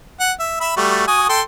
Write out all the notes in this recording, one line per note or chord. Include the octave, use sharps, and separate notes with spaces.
F#5
E5
E5 B5 E6
G3 A3 F#4
F#4 G#5 D#6
A4 G5 C6